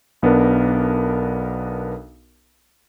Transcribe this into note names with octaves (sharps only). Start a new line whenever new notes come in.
B1 B3 D4 A#4